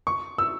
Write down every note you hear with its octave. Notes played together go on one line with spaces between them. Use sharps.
C#6
E6